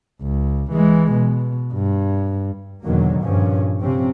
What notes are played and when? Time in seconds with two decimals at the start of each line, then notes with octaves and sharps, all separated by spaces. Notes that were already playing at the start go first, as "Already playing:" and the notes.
0.22 C#2
0.72 E3 G#3
1.13 B2
1.74 G2
2.83 E2 B2 D3 D#3 F#3 A#3
3.21 G2 A#2 F3 C#4
3.79 C3 F3 C4 C#4